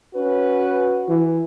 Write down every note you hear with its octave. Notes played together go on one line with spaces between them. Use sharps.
C#4 F#4 B4
E3